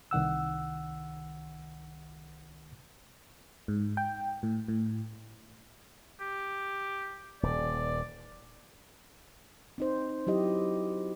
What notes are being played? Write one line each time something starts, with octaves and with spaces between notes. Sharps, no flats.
C2 D#3 F#5 E6
G#2
G5
A2
A2
G4
D#1 D5
C4 D#4 C5
F#3 E4 G4 D#5